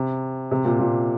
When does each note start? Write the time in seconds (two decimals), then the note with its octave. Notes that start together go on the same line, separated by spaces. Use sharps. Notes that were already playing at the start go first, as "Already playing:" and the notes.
Already playing: C3
0.51 C3
0.65 A#2
0.79 A#2